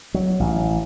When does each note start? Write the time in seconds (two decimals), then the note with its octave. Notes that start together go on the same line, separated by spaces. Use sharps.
0.14 F#3
0.40 A1